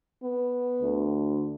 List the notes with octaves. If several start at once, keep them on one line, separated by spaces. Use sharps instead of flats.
B3
D2